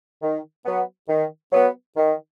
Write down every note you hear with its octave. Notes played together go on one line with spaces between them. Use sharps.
D#3
F#3 B3
D#3
F#3 B3
D#3